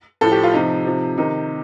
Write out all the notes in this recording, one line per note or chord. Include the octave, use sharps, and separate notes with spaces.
A2 F3 A4
G4
F4
C3 F3 D#4
C3 F3
C3 D#3 D#4